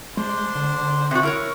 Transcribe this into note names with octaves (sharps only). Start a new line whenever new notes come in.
G#3 D4 C5 C6
D3
C3 F#4
E4 A#4 C#5